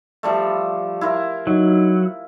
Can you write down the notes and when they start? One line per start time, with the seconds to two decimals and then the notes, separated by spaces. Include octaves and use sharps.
0.23 F3 G3 A3
1.01 E4 F4 A#4
1.47 F#3 D#4